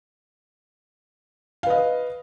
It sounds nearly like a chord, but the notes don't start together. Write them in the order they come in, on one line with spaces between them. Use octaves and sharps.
F5 B4 D#5